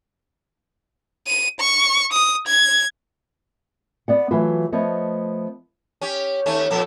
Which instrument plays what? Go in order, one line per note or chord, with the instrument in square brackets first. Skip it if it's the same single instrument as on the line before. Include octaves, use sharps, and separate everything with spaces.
[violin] D#7
C#6
D#6
G#6
[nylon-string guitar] B3 D5 F#5
E3 F#3 A3 F4 F#4 B4
F3 A3 B3 C#5 D#5
[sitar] C#4 G4
D#2 A3 C#4
F2 A#2 A4